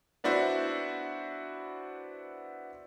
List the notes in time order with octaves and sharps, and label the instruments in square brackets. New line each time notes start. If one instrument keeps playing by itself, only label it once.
[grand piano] B3 D4 E4 F#4 C5